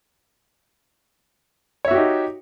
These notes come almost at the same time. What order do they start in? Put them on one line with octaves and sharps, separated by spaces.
C#5 E5 F#4 G4 D#4